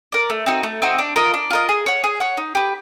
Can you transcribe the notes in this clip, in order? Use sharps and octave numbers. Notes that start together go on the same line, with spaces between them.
A#4 D5
A3
C4 D#4 F#4
A3
C4 D#4 F#4
D4
F4 A#4 D#5
D4
F4 A#4 D#5
G#4
C#5 F#5
G#4
C#5 F#5
D#4
G4 B4